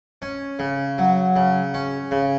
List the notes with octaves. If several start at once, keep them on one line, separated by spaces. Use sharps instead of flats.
C#4
C#3
F#3
C#3
C#4
C#3